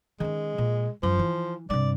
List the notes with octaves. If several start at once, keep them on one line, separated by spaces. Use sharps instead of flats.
D#3 G#3 C#4
A#2
F#2 F3
E3
G2 C3 D5